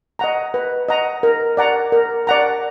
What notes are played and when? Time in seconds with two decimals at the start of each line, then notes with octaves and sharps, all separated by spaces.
0.19 D#5 F#5 A#5
0.54 B4
0.89 D#5 F#5 A#5
1.23 A#4
1.57 D5 F#5 A#5
1.92 A#4
2.27 D5 F#5 A#5